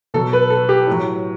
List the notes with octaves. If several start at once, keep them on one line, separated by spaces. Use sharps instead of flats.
B2 F#3 A4
B4
A4
G4
A2 F#3